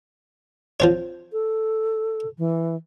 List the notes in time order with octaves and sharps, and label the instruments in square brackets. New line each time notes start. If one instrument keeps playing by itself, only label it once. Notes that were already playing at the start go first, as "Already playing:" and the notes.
[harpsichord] F3 C4 C#5
[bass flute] A4
E3